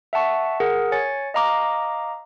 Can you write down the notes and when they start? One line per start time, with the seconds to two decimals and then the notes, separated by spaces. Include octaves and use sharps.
0.13 E5 F#5 A5 C#6
0.60 G#4 A#4 F#5
0.92 C#5 G#5 A6 C#7
1.34 D#5 F5 A#5 D6